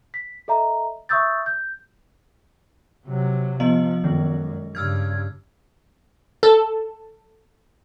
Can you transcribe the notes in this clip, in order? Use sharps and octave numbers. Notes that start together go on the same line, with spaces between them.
B6
A4 D#5 E5 A#5
E5 C#6 D#6 E6 G6 A6
G6
C3 F#3
F3 B3 D#5 F#7
F#2 D#3 G#3
G2 C#3 E6 F6 G#6
A4